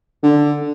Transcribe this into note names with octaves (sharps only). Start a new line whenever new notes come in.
D3